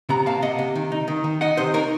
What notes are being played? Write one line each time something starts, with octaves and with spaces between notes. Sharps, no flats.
C3 F#5 A#5
A#3 F5 A5
C3 D#5 F#5
C3
D#3
D#4
D#3
D#3
D#4 D#5 F#5
C3 C5 D#5
D#4 A#4 C#5